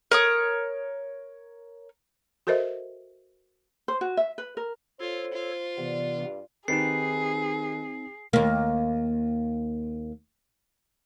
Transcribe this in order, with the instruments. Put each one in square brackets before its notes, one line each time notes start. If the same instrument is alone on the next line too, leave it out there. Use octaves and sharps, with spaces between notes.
[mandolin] A#4 C#5 D#6
[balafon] F#4 A4 A#4 C5 D#5 E5
[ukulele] C5
F#4
E5
B4
A#4
[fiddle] F4 [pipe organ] A4 C#5 [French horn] C5
[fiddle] F4
[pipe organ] C3 E3 B3 [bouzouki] D4
[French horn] G2
[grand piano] D#3 G4 B4 [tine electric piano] C4 D#4 [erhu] G#4 [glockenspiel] C7
[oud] D#2 A#3